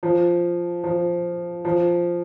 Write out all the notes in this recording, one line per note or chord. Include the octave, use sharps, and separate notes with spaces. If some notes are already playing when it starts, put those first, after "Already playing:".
F3
F3
F3